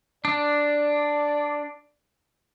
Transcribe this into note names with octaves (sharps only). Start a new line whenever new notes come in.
D4 D5